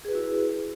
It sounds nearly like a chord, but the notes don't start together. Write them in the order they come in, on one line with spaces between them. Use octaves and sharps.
G#4 B4 F#4 E4